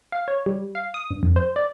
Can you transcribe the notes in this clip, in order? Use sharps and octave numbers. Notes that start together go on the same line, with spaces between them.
F5
C#5
G3
F5
D#6
G2
F2
C5
D5